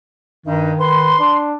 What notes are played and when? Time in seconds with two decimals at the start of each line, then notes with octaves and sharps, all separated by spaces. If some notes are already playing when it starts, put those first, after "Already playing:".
0.46 G2 D#3 D#4
0.80 B4 C6
1.19 D4